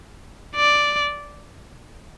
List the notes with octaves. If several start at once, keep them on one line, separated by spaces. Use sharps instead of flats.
D5